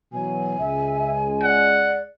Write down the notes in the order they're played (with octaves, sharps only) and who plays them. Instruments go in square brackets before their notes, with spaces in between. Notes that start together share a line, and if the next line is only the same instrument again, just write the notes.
[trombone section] B2 E3 F#3 [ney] G#5
[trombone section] C#2 G#3 [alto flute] E5
[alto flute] D5 [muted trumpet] F#5